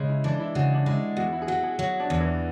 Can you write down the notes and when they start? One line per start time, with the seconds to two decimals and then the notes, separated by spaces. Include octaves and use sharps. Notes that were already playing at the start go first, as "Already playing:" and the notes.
Already playing: C#3 G#3
0.09 E4
0.24 E3 D4
0.40 E4
0.55 C#3 F#4
0.74 D4
0.86 G#3 E4
1.17 E2 F#4
1.33 E4
1.42 G#4
1.47 F#3 F#4
1.63 G#4
1.79 F#3 F#4
2.00 D4
2.10 E2
2.20 E3